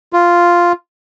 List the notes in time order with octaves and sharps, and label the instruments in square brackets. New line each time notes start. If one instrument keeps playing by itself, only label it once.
[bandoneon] F4